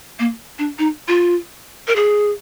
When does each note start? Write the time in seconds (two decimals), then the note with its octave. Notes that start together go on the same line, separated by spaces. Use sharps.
0.19 A#3
0.59 D4
0.79 D#4
1.08 F4
1.88 A#4
1.96 G#4